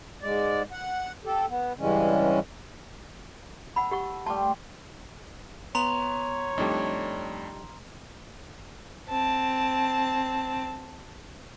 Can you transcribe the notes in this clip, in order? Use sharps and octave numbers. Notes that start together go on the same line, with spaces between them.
G#2 G#3 D5
F#5
G4 A4
B3
G2 C#3 E3 G3 G#3 C#4
A4 F#5 B5
G4 F#5 C#6
G3 A3 A5 C6
B3 C#5 A#5 C6 F7
F2 G3 A3 D4 D#4
C4 A5